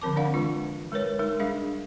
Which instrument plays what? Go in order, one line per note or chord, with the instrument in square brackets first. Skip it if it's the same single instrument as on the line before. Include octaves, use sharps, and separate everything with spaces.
[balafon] D3 F3 C4 A#4 A5 D6
C4 D4 D5 F5 F#5
E3 G#3 D4 F4
G#3 A#4 B4 C#5
G#3 D#4 A#4
G3 D4 G#4 E5 F5